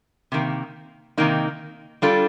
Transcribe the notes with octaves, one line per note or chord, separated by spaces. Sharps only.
C3 D#3 A#3
C3 D#3 A#3 D#4
G3 D4 F4 A4